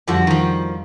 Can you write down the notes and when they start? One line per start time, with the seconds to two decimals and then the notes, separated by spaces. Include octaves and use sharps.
0.07 F2 D3 F3 G3 F#4
0.27 D#3 F3